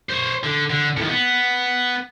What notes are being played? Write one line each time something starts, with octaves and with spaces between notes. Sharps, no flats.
C5 C#5
D3
D3
A2 D#3
B3